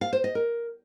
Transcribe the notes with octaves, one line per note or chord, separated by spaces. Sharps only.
F5
C5
D#5
A#4